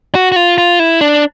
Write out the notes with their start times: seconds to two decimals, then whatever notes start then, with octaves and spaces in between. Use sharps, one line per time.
0.15 F#4
0.32 F#4
0.36 F4
0.58 F4
0.80 E4
1.01 D4